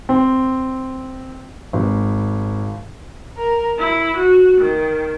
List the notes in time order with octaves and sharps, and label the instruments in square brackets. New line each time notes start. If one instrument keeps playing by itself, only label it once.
[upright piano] C4
G#1
[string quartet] A#4
E4
F#4
D#3